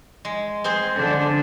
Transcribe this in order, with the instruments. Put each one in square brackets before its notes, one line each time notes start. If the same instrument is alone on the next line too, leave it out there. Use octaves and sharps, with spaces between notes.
[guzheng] G#3
C4 G#4 C5
[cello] D3 D4